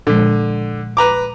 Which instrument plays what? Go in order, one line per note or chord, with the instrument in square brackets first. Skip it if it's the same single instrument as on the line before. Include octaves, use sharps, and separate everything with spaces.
[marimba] A#2 F3 G#3 [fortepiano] D3
[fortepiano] B4 A#5 D6